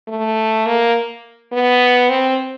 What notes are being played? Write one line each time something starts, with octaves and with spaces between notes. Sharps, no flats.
A3
A#3
B3
C4